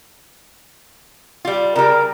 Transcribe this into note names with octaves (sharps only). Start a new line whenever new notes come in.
G3 F4
C#3 G3 A#4